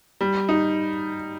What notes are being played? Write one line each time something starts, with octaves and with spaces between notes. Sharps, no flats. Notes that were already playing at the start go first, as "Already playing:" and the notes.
G3
D#4